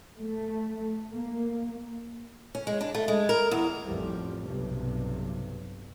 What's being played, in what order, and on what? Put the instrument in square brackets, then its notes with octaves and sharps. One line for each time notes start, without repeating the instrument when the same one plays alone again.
[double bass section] A3
A#3
[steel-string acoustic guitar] C#4
G#3
D4
A3
G#3
A#4
E2
[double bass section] A1 F2 F3 G3
B1 G2 C3